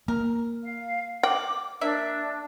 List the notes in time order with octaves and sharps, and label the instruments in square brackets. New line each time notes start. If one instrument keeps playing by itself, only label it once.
[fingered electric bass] A#3 [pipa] A#4
[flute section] F5
[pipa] F#5 [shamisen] G5 [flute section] D6
[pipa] A#3 E5 [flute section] D4